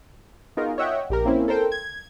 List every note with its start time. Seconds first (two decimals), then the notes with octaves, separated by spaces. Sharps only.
0.57 B3 D#4 F4 F#4 G#4 A#4
0.78 C#5 D#5 E5 F#5 G5
1.10 A#1 G4 A#4
1.25 A#3 C4 C#4 E4
1.48 A4 A#4 C5 G5
1.72 G#6